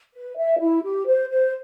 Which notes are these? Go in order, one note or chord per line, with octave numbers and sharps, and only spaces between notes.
B4
E5
E4
G4
C5
C5